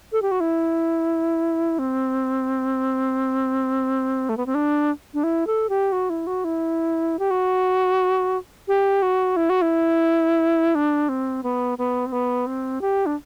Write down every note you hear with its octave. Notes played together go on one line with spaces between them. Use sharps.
A4
G4
F#4
E4
C4
A3
B3
C4
D4
D4
E4
A4
G4
F#4
E4
F#4
E4
G4
F#4
G4
F#4
E4
F#4
E4
D4
C4
B3
B3
C4
B3
C4
G4
D4